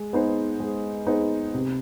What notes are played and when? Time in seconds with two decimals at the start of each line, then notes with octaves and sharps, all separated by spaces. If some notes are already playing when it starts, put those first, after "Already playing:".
Already playing: G#3
0.13 B3 D#4 G#4 C5
0.60 G#3
1.07 B3 D#4 G#4 C5
1.54 C3